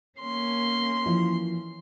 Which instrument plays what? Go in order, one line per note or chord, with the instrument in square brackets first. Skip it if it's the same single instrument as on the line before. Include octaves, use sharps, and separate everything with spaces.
[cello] A#3 C#4 [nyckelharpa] C6
[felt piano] E3 F3